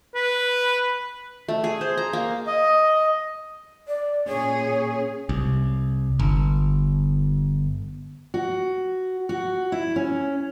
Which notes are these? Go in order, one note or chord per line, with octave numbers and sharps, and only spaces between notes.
B4
A3
G#4
C5
A#5
A#3
D#5
D5
A#2 C#4 G#4 C#5
C2
G1
F#4
F#4
E4
C#4